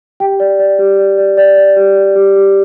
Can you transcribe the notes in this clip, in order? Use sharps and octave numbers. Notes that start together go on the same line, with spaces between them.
G4 G5
D5
D5
G4
D5
D5
D5
D5
G4
D5
G4
G4